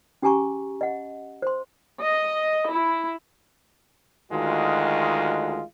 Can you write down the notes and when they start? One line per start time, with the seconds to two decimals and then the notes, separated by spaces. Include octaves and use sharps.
0.22 C#4 G4 G#4 G#5 A#5 C#6
0.81 D#5 F#5
1.42 C5 C6
2.01 D#5
2.71 E4
4.31 D2 D#3 G#3 F4 F#4